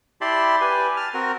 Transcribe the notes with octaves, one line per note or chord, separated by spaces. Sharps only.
E4 G4 D5 A5 B5 C6
G4 B4 G#5
A5 F6
C4 F#4 A#4